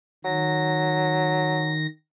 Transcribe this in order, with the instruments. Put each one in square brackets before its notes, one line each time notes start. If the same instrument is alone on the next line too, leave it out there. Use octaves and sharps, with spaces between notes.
[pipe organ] D#3 A#6 [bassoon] F#3